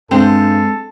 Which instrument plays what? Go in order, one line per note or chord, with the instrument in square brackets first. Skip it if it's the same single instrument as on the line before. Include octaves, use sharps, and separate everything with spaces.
[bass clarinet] G2 [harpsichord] G#3 [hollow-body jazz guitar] C4 C5 G5 [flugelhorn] A4